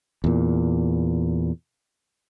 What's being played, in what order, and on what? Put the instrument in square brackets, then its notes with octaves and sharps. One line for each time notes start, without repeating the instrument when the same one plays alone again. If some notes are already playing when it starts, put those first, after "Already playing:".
[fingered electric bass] E2 A#2